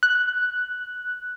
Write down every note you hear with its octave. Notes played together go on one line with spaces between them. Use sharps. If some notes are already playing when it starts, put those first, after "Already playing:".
F#6